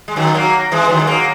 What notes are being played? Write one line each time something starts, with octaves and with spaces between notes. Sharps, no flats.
G#3
D#3 F#3
F#3 A#3
E3 G#3
D#3 F#3
G#3
F#3 A#3